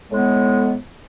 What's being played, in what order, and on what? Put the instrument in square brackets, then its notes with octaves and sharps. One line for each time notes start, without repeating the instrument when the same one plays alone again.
[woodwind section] A2 G#3 B3